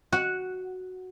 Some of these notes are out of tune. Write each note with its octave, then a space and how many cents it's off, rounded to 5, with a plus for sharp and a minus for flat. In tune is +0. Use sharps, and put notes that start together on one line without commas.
F#4 +0 F#5 -5